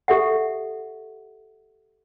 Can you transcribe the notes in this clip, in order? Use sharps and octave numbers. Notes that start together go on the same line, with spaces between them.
G4 A4 E5 F#5